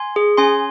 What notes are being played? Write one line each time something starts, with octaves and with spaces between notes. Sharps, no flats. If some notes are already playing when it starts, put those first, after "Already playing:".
Already playing: G#5 C6
G#4
C#4 G#5 C6